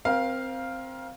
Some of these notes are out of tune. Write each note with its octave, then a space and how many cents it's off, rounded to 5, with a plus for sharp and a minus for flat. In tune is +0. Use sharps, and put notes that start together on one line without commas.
C4 +0 A#4 +30 F5 +0